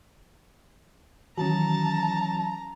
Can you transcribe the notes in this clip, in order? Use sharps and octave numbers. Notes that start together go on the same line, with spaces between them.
D#3 E3 F#3 C#4 F#4 A5 A#5